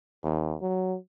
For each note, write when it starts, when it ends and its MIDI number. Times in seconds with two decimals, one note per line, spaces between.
0.24 0.56 39
0.62 0.97 54